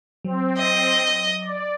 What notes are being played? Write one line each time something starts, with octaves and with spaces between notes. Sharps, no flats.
F#3 C4
D#5
D5